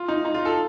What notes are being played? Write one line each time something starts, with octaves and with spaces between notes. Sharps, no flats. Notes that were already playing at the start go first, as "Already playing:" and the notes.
Already playing: F4
D#4
D#4
F4
A4